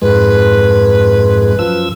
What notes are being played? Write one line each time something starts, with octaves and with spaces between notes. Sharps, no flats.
F2 G#2 G#3 B4
F#2 F3 E6